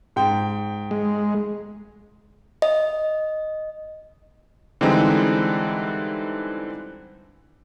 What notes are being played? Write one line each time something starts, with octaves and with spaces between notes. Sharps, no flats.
G#2 G5
G#3
D#5
D3 E3 G3 G#3 C4 D#4